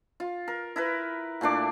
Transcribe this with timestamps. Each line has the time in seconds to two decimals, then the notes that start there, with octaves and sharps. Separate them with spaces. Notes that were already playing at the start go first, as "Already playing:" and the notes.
0.20 F4
0.48 A#4
0.76 E4 A#4 B4
1.41 A#2 A3 D4 D6